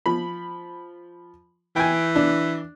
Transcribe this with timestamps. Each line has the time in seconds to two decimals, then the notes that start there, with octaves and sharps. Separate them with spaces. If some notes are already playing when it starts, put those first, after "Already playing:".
0.06 F3 B5
1.76 E3 G5 G#5
2.16 D4